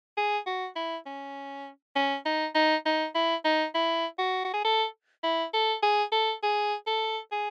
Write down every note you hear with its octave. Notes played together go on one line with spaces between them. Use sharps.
G#4
F#4
E4
C#4
C#4
D#4
D#4
D#4
E4
D#4
E4
F#4
F#4
G#4
A4
E4
A4
G#4
A4
G#4
A4
G#4